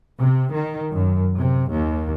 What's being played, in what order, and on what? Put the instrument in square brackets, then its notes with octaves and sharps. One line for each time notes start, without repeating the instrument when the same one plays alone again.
[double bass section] C3
D#3
F#2
C3
D#2